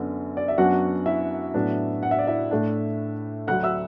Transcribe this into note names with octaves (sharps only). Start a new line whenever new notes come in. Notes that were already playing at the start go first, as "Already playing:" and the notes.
Already playing: F#2 D3 B3
D5
E5
F#2 F#3 B3 D4 F#4 F#5
E4 E5
A2 F#3 B3 D4
F#5
E5
D5
E4 E5
A2 A3 D4
D2 D3 F#3 F#5 F#6
E5 E6